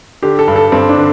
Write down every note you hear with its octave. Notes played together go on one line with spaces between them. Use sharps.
D3 G4
A4
G2
A4
G2 C4
D4
D3